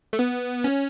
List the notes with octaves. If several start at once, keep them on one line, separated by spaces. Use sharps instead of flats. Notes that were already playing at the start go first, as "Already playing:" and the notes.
A3
B3
C#4